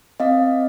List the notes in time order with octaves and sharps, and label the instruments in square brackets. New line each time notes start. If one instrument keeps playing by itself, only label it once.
[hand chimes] C4 D#5 F5